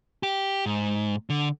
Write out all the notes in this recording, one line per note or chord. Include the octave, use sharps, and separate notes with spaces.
G4
G#2
D3